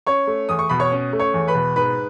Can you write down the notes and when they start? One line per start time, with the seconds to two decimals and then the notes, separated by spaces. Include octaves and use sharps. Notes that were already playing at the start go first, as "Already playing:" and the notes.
0.07 C#4 C#5 C#6
0.27 A3
0.49 E2 D#6
0.59 C#6
0.69 B2 B5
0.80 C#5 C#6
0.92 C#4
1.13 A3
1.19 C#5 C#6
1.34 E2
1.48 B4 B5
1.55 B2
1.76 G#2 B4 B5